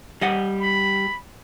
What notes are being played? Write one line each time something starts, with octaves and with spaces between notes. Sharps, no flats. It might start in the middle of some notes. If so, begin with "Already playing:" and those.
G3 D#5 F#5
B5